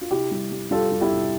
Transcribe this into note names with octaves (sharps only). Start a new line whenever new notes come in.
F4
C3 E4 G4
G3
G3
G3 F4 A4
G3
E4 G4
C3